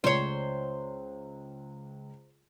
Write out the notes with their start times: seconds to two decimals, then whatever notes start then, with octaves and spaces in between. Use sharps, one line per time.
0.04 C#2 C5 C#5